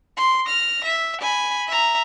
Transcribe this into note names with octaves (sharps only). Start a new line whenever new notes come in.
C6
F6 A#6
E5
G#5 B5
E5 A#5